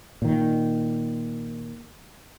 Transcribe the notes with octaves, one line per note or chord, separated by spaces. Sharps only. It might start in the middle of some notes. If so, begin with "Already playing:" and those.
A#2 D#3